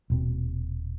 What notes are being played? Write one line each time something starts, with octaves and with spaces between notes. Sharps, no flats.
D#1 B2 C4